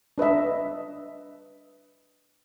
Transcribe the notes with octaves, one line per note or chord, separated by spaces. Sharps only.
D4 B4 D#5 E5